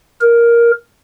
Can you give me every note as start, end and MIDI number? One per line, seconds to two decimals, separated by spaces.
0.21 0.72 70